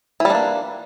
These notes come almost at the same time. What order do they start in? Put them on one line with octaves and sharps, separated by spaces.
E3 G3 D4 A#3